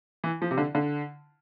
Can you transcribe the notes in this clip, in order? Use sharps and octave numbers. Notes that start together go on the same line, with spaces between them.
E3
F3
C3
D3
D3